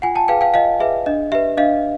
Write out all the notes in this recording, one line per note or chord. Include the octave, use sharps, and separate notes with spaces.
F4 F#5 G#5
G5 A5
G#4 B4 F5 G5
F5 G5
F4 D#5 F5
G#4 B4 E5
D4 D#5
G4 B4 E5
D4 D#5 F5